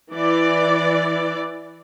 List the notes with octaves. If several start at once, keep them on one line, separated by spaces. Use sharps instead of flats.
E3 D5